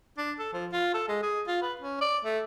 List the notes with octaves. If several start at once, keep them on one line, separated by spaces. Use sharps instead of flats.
D4
A4
F3
F4
A4
G#3
G#4
F4
B4
C#4
D5
A3